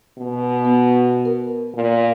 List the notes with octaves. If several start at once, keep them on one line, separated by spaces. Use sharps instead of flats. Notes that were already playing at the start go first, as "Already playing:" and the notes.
B2
B3
A#4
A#2